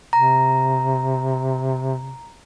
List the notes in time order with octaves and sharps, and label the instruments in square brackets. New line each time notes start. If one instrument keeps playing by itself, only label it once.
[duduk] C3 [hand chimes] A#5